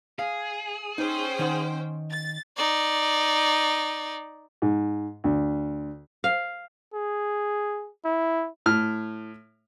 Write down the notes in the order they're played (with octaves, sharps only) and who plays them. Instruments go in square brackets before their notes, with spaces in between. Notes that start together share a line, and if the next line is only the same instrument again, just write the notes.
[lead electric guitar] G#4 [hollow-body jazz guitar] F5
[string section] C#4 C5 G5 [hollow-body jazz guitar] D#4
[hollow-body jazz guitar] D#3 D#4 F#5
[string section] A6
[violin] D#4 D5
[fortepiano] G#2
D2
[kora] F5
[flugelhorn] G#4
E4
[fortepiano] A2 F6